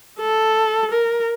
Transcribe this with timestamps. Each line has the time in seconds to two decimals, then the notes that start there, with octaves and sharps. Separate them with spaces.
0.20 A4
0.91 A#4